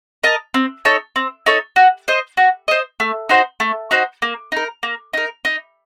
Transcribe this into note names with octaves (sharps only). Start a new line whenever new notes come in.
A#4 D#5 A5
C4
D#4 A4 C#5
C4
D#4 A4 C#5
F#4
C5 D#5
F#4
C5 D#5
A3
D#4 F#4 C5
A3
D#4 F#4 C5
A#3
D#4 A#4
A#3
D#4 A#4
D#4